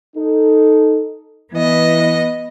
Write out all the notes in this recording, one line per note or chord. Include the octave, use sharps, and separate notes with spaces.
D#4 A4
E3 B3 D#5